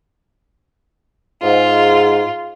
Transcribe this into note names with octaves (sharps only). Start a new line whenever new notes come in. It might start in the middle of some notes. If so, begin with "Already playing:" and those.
G#2 F4